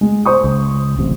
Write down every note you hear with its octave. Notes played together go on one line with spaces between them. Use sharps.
G#3
C5 C#6 D#6
C#2
D1 A1 C3